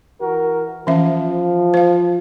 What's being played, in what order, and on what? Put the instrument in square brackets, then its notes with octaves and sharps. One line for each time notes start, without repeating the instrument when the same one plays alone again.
[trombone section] E3 F#4 A#4
[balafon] E3 C#4 E5 [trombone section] F3
[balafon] C5 F5